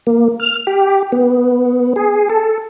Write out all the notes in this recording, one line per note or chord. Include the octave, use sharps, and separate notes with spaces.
A#3
F6
G4
B3
G#4
A4